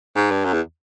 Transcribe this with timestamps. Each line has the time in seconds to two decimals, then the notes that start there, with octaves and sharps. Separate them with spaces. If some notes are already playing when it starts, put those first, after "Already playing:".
0.16 G#2
0.31 G2
0.45 F#2
0.53 E2